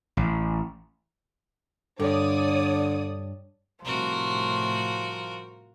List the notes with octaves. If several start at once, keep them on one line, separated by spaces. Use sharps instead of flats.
A1
G2 D3 A4 C#5 D5 D#6
A2 C3 F3 G3 F#4 A#4